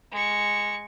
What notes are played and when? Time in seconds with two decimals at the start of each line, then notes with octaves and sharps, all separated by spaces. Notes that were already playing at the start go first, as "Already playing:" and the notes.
0.11 G#3 C#6